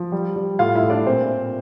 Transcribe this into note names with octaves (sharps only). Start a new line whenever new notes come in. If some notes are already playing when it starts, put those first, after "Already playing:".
Already playing: F3
G3
G3
A2 F4 F5
E4 E5
A2
D4 D5
A#2 C4 C5